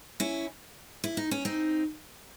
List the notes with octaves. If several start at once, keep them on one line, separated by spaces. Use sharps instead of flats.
C#4 E4
E4
D#4
C#4
C4 D#4